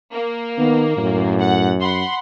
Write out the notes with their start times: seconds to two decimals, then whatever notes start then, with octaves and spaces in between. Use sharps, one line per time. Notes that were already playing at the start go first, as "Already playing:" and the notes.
0.13 A#3
0.58 D#3 B3
0.98 F#2 A2
1.41 F#5
1.81 F#5 B5 C6